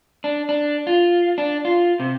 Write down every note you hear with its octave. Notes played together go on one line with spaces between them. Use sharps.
D4
D4
F4
D4
F4
C3